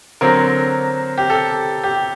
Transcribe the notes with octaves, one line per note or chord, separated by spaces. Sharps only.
D3 F#3 C4 A#4
G4
A4
G4